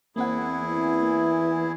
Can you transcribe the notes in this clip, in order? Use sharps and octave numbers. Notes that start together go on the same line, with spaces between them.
E2 A#3 C4 E4 G#4 F#5
E3
A#3